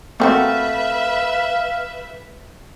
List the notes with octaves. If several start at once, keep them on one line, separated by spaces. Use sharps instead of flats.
A3 A#3 C4 F#4 B4 E5 F5